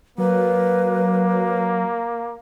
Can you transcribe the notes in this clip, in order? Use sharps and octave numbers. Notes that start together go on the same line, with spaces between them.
F#3 A#3 B4